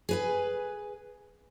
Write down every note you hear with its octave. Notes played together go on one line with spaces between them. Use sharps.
G#4 B4 G#5